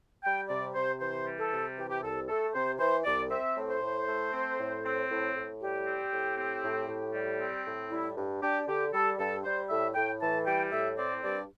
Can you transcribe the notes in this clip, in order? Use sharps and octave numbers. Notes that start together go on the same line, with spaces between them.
G3 G5
C3 D5
C3 C5
E3 C5
G3
A4
C3
E3 G4
G4
C2 A4
A3 A4
C3 C5
E3 C5
C2 D5
C4 E5
A2
C5
A2
A3
C4
A2
C4
A2
A2
G3 G4
C4
A2
C4
A2
A2
G3
C4
A2
G3 E4
G2
D4 G4
D3 G4
G3 A4
G2 A4
G3 C5
A2 E5
A2 G5
E3 A5
G3 G5
A2 E5
C4 D5
G2 D5